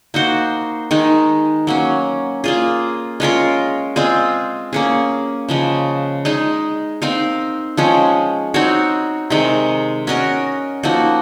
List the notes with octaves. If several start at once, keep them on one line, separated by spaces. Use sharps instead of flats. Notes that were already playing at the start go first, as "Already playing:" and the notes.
A#3 D#4 F#4 C5
D#3 G#3 D#4
F#3 A#3 C#4
A#3 F4 G#4
G#3 C#4 F4 A#4
G#3 C4 F4 G#4
A#3 C#4 G#4
C#3 F3 G#3
G#3 D#4 G#4
C4 D#4 A#4 F5
F3 G#3 C#4 G#4
C4 D#4 F#4 C#5
C3 D#3 G#3
C#4 F#4 A#4 D#5
F3 A#3 D#4 F#4